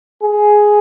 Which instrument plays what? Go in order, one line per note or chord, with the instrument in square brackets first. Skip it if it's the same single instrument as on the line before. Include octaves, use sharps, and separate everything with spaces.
[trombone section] G#4